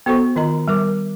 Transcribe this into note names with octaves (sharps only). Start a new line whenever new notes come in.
B3 F#4 A4 C5 C#6
D#3 F4 D#5 A#5
G3 A#4 D6